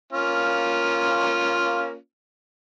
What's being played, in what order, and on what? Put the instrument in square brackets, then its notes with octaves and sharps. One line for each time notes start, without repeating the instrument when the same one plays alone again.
[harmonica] A#3 C#4 F4